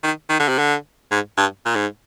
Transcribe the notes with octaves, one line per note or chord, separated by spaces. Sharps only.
D#3
D#3
D3
C3
D3
G#2
G2
A#2
G#2